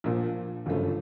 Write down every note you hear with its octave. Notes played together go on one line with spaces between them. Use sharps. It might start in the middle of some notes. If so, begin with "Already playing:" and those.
A#1 A#2 F3
G1 F#2 C#3 F3 A3